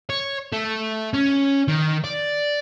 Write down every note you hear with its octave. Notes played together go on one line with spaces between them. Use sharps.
C#5
A3
C#4
D#3
D5